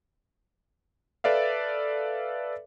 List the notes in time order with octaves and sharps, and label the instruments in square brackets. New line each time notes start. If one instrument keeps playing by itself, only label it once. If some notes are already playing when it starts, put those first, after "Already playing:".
[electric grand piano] A4 B4 D5 E5 F5